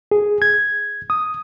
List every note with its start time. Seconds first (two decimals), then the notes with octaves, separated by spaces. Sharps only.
0.11 G#4
0.42 G#6
1.10 D#6